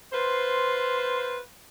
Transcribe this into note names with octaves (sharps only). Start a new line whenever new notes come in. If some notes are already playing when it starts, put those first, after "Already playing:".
F4 B4 C5